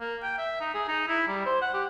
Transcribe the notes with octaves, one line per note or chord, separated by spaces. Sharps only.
A#3
G5
E5
D#4
G#4
D#4
E4
G3
C5
F#5
G4